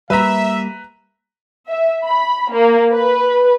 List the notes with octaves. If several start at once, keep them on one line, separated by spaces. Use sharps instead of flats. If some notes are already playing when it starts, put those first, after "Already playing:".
G3 A#3 B4 E5 A#5
E5
B5
A#3
B4